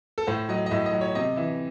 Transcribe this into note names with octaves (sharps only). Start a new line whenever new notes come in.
A4
A2 C5
F#3 D#5
D#5
A2 E5
D#5
F#3
C#5
C3 D#5
E3 E5